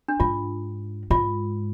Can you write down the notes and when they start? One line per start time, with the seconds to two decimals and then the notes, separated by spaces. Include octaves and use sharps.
0.08 D4
0.20 G#2 F4
1.10 G#2 F4